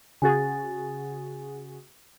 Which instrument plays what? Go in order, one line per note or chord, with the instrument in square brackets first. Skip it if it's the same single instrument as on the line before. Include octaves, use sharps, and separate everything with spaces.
[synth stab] C#3 F#4 G#4 [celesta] G#5 A6